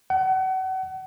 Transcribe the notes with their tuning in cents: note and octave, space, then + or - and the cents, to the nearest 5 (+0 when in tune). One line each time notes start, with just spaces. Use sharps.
F#5 +35